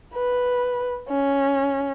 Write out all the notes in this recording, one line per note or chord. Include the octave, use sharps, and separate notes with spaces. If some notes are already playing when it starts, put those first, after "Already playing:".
B4
C#4